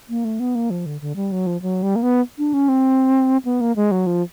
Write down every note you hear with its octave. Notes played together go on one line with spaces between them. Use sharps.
A#3
A3
B3
A#3
F3
D3
D3
G3
F#3
F3
F#3
G3
A#3
B3
D4
C#4
C4
B3
A#3
G#3
F#3
F3